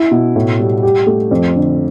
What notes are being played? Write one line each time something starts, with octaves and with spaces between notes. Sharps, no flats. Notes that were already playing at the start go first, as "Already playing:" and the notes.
Already playing: E4
B2
A2
G3
G4
A3
F2
D3